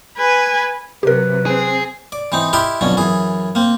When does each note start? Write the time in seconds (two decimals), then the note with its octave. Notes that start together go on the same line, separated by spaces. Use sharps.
0.18 B4 G#5
1.03 C3 F#3 G4 A#4 B4
1.46 C4 G#4
2.12 D5
2.32 E3 C4 D#4
2.53 E4 G4 A#4 D#5 A5 C6
2.81 B1 F2 D3 C#4
2.97 F#2 E3 G#4
3.55 A#3 C4